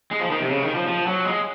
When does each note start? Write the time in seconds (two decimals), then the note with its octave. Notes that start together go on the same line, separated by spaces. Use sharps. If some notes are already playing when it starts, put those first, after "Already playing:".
0.11 G#3
0.21 F3
0.30 D#3
0.40 C3
0.50 C#3
0.62 D#3
0.75 F3
0.88 F3
1.07 F#3
1.25 G#3